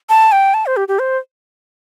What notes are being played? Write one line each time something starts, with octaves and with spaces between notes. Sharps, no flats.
A5
G5
A5
C5
G4
G4
C5